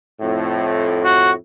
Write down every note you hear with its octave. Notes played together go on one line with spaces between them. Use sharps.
F2 A2
F#4